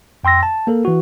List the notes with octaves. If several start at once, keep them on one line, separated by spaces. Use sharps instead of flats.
F2 G5 C6 E6 A#6
A5
A#3 A4 A#4
E3 F#4